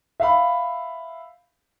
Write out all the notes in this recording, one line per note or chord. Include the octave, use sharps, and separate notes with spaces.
E5 F5 B5